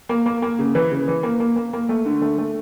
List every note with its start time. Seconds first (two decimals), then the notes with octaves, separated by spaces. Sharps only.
0.09 A#3
0.26 A#3
0.42 A#3
0.59 C#3
0.75 E3
0.92 C#3
1.08 E3
1.23 A#3
1.40 A#3
1.56 A#3
1.73 A#3
1.89 A3
2.06 D3
2.22 A3
2.38 A3